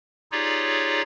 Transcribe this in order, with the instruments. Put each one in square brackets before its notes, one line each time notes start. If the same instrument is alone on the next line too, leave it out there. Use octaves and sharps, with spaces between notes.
[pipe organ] D#4 F4 G4 G#4 C#5 D5